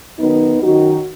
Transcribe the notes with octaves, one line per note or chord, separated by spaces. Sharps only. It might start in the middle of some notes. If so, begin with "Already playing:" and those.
F#2 D#3 B3 D#4
F#2 D#3 D#4 F#4